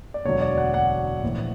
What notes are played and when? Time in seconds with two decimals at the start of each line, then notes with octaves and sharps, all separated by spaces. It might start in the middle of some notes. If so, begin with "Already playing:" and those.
0.14 D5
0.25 E1 D2 D3 F#3 C#5
0.42 D5
0.58 F#5
0.74 F#5
1.23 A#1 A2 E3